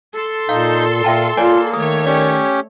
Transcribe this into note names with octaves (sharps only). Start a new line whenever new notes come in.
A4 C6
A#2 D#4 F5 G6
A#2 F4 E5 G5 A5
A#3 F4 C#5 D5 G#5
D#3 A3 C#5 D#6
C#4 G4 D5